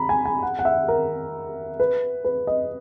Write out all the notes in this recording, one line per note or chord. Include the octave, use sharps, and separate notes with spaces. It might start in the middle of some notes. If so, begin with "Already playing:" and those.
Already playing: A#5 B5
G#5
G#5
F#5
F#5
E5
A#4
B4
B4
D#5